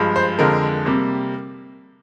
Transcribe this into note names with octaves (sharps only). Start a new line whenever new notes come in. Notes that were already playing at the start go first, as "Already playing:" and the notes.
Already playing: G2 F3 G#3
C5
F2 D3 F3 G#3 A#4
C3 G3 A#3